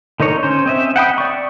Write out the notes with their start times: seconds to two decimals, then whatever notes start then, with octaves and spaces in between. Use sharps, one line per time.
0.20 D3 D#4 A#4 C#5
0.43 C#4 C5
0.66 C4 D#5 E5
0.96 F#5 G5 B5 D#6
1.18 D5 C#6